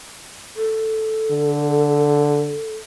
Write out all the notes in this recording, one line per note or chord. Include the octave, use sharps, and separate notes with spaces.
A4
D3